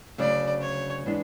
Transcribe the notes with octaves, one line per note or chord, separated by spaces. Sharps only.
D2 C#3 F#3 D5
C#5
E3 G#3 B3 D4